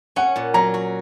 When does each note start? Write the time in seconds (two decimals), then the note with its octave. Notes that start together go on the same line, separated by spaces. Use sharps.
0.16 C#4 F#5
0.36 A#2
0.54 F#3 A#5
0.74 F#4